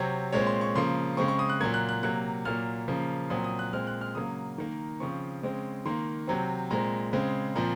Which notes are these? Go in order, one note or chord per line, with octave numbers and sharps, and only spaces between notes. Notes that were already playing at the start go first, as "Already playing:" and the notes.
Already playing: C3 F#3 C4 C#5
A#2 G#3 C4 C#5
C6
C#6
C#3 F3 A#3 C6
C#3 G#3 C4 C#6
C#6
D#6
F#6
A#2 F#3 A#3 G#6
F#6
F#6
C3 F#3 A#3 F#6
A#2 F#3 A#3 F6
C#3 F3 A#3
A#2 F#3 C4 D#6
D#6
F#6
A#2 G#3 C4 F6
F#6
F6
C#3 F#3 A#3 D#6
D#3 A#3
C#3 F3 C4 C#6
C#3 G#3 C4
D#3 A#3 C6
C3 F#3 C4
A#2 G#3 C4 A#5
C#3 G#3 C4
A#2 F3 C4 A#5